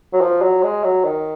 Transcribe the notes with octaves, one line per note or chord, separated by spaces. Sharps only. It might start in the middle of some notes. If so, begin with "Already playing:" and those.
F#3
F3
F#3
G#3
F#3
D#3